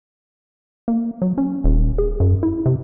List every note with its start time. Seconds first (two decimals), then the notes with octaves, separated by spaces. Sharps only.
0.88 A#3
1.22 F#3
1.38 C#4
1.64 D#1
1.98 G#4
2.20 F#2
2.43 E4
2.66 C3